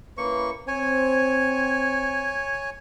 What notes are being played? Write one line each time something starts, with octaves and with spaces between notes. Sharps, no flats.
A#3 C#4 E4 B4 C#6
C4 C#5 G#5